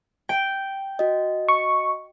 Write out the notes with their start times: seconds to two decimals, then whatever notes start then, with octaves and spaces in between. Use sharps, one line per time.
0.29 G5
0.99 F#4 D#5
1.48 C#6